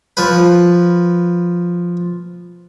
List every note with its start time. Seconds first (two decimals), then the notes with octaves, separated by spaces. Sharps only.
0.17 F3 B4